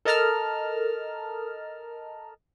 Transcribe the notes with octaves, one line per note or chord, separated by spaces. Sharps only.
A4 A#4 D#5 A5 A#5 F6